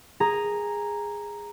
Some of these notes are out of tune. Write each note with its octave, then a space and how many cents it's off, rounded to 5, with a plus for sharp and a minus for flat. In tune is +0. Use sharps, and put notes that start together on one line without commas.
G#4 -10 A#5 +0